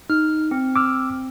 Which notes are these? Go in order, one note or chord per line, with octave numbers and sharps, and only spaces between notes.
D#4 F6
C4
D6 E6 F6